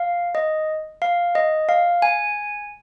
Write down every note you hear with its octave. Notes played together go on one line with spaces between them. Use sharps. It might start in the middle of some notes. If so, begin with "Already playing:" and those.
Already playing: F5
D#5
F5
D#5
F5
G#5